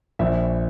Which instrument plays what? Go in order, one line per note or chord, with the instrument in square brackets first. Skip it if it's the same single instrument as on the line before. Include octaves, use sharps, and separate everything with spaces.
[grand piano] A#1 E5